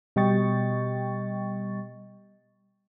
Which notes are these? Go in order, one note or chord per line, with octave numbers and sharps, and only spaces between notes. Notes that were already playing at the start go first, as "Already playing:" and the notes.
B2 G3 D#5 G5 C#6 A6